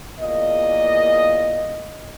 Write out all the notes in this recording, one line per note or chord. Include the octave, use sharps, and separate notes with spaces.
E2 A#2 A#3 D#5